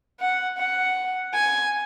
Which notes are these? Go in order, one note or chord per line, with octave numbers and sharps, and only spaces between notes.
F#5
F#5
G#5